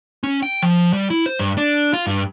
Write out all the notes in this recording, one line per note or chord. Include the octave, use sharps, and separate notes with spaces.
C#4
G5
F3
G3
E4
C5
G2
D4
F4
G2